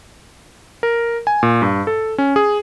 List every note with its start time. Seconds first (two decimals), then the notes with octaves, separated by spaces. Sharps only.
0.83 A#4
1.27 G#5
1.43 A#2
1.62 G2
1.87 A4
2.18 C#4
2.36 G#4